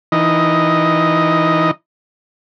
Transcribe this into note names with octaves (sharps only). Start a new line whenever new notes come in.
E3 D#4 D#5